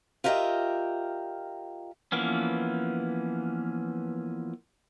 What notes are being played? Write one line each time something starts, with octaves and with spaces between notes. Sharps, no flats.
F4 G4 A#4 D#5 E5 G5
E3 F3 A#3 B3 C#4